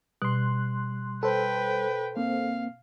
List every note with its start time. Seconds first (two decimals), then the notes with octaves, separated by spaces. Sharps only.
0.22 B2 G3 C6 F#6
1.23 A4 B4 C5 G5
2.17 A#3 C4 F5